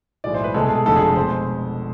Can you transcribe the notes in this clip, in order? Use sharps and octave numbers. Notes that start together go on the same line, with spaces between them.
B1 A2 E3 G#3 D5
C5
B4
C2 B2 G#3 A4
G#4
G#4
F1 F2 D3 F3 G#3 A4
G#4
A4
B2 G#3 C5